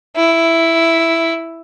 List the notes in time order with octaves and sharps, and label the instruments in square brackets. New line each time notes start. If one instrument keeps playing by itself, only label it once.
[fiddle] E4